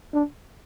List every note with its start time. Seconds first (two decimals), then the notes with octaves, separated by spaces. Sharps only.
0.13 D4